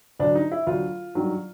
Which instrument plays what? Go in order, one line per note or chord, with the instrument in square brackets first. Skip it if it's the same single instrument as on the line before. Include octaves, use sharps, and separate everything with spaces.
[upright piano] D2 D3 F#3 D4
D#4
E4
D2 D3 F#3 F4
G2 D#3 F#3